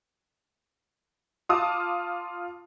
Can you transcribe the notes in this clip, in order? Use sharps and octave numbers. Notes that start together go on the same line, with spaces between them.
F4 A5 D6 D#6 F6